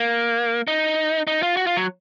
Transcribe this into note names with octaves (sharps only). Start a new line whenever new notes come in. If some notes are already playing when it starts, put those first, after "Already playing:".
Already playing: A#3
D#4
D#4
F4
F#4
F4
F#3